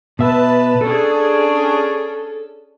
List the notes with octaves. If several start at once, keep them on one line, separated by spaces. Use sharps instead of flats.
B2 B4 E5 A5
C#4 D4 G#4 A4